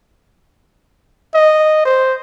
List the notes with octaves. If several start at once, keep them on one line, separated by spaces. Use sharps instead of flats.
D#5
C5